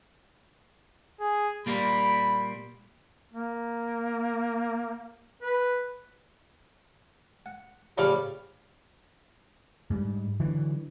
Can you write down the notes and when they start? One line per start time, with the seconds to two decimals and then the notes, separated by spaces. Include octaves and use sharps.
1.20 G#4
1.66 A#2 G3 A#3 B5
3.33 A#3
5.42 B4
7.46 F#5
7.98 A2 C#3 F3 G3 G4 D5 F5
9.90 G#2 G3
10.40 D3 E3 F#3